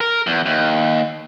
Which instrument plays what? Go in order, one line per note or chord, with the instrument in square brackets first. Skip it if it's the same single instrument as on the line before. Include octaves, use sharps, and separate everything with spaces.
[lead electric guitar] A#4
E2
D#2